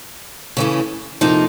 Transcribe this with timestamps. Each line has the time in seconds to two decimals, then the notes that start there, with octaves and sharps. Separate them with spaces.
0.57 C#3 E3 A3 C#4
1.21 F2 C3 F3 A#3 D#4